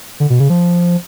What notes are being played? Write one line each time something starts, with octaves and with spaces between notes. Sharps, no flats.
D3
B2
C#3
F3